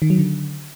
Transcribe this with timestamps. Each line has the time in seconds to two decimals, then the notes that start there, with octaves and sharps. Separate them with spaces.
0.02 D#3
0.10 F#3
0.18 D3